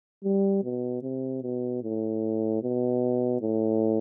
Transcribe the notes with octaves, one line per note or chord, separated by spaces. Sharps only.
G3
B2
C3
B2
A2
B2
A2